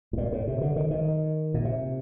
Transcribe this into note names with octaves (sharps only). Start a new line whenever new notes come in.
A2
A#2
A2
C3
D3
D#3
D#3
A#2
C3